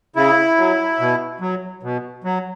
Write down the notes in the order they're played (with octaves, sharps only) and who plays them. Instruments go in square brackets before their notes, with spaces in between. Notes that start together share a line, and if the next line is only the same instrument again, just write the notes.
[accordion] C#3 E4
F#3
B2
F#3
B2
F#3